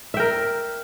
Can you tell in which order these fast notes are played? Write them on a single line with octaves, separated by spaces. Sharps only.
E5 G5 A#4